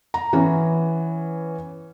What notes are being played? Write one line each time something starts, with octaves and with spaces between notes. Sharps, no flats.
A#5
E3 B3 C#4